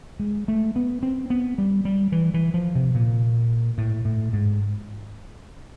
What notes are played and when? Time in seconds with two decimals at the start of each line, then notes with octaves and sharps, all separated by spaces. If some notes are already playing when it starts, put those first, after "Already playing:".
0.20 G#3
0.48 A3
0.76 B3
1.03 C4
1.30 B3
1.58 G3
1.85 G3
2.12 E3
2.34 E3
2.54 F3
2.75 C3
2.95 A#2
3.78 A2
4.05 A2
4.33 G#2